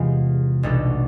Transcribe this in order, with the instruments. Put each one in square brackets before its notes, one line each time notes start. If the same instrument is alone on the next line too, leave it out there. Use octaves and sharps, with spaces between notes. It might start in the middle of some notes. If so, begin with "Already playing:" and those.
Already playing: [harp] E2 C3 G#3 B3 F4
B1 B2 A3 D4 A4